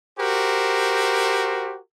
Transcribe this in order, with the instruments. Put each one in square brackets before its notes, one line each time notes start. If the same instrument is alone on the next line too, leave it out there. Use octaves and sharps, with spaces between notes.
[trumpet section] F#4 G4 A#4 C5